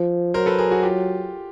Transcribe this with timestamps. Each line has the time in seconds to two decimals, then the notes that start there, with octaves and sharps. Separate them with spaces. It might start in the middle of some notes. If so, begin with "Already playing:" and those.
Already playing: F3
0.34 F#3 A#4 C5
0.46 A4 B4
0.59 G#4 A#4
0.71 F#4 G#4
0.83 F4 G4